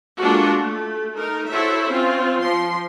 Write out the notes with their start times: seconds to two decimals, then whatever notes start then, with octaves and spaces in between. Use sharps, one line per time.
0.18 G#3 A#3 D4 F4 F#4 A4
0.57 A3
1.14 A3 D#4 A#4
1.49 E4 F#4 A4 C5 C#5 E5
1.89 C4 C#4 F4
2.40 F3 C6